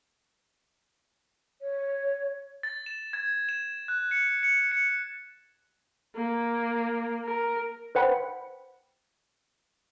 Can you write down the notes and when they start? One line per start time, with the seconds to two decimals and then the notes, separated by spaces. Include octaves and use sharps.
1.62 C#5
2.63 A6
2.86 E7
3.13 G#6
3.49 E7
3.88 F#6
4.11 C#7
4.43 C#7
4.72 C#7
6.16 A#3
7.25 A#4
7.95 B4 C5 F#5 G5 B5